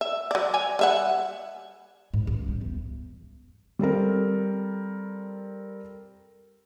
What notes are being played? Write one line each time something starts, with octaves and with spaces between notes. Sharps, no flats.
E5
F#3 D5
C#5 D5 G#5
G3 E5 F#5
G#2
C#2
G3
E2
G3 C4 A4 A#4